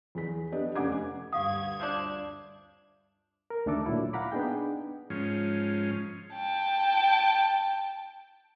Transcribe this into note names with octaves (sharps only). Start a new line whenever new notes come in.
E2 G#4 B6
B3 D4 G4 D#5
F1 C#4 F#5 D6 G#6
D2 G2 G4 F5 F#5 D#6 G#6
C3 F3 D4
A#4
D2 D#3 A3 D4 A4 D6
A#2 F#3 E4
F5 F#5 A#5 B5 D6
B3 D4 D#4 G#4 G5
G#2 F3 C#4
G5 A5